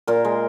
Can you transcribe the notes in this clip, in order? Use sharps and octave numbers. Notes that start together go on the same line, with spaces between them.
A#2 A#4
G#3